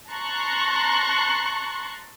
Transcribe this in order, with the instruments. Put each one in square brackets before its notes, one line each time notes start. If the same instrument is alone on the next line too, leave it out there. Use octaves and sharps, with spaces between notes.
[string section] A5 A#5 C6 C#6 F#6